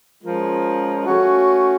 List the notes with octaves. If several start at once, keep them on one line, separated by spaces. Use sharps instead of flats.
F3 G#3 C#4 F4 A#4
A3 C#4 F#4